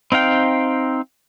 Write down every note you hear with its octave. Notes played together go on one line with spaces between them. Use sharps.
C4 D#4 F5 G5